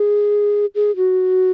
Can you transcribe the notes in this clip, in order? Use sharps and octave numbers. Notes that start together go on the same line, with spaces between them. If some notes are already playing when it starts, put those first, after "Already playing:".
Already playing: G#4
G#4
F#4